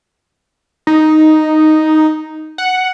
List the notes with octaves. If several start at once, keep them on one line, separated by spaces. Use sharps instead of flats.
D#4
F#5